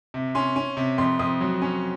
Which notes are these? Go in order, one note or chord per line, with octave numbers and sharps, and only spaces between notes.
C3
C#4 C6
C#4
C3
F2 C6
F2 D#6
F#3
C#4